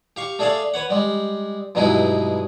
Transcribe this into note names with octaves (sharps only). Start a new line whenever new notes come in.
G4 F5 C#6
A3 D4 G#4 A4 D5 F5
B4 C#5 F#5
G3 G#3
G2 B2 F#3 G#3 D#4 E4